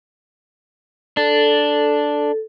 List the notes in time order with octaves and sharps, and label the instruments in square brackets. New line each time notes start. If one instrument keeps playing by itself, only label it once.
[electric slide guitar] D4 [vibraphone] A4